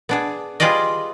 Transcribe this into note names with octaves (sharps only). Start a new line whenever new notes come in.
B3 D4 G#4
G3 F4 G#4 B4 D5 D#5